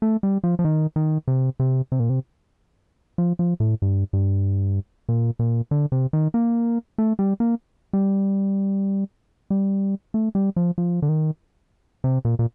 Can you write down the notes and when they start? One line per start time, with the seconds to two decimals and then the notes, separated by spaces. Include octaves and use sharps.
0.02 A3
0.23 G3
0.44 F3
0.59 F3
0.65 D#3
0.96 D#3
1.28 C3
1.60 C3
1.92 C3
2.00 A#2
2.10 C3
3.18 F3
3.39 F3
3.60 A2
3.82 G2
4.13 G2
5.09 A#2
5.39 A#2
5.71 D3
5.92 C3
6.13 D#3
6.34 A#3
6.98 A3
7.19 G3
7.40 A#3
7.93 G3
9.50 G3
10.14 A3
10.35 G3
10.56 F3
10.78 F3
11.02 D3
11.09 D#3
12.04 C3
12.25 A#2
12.39 A#2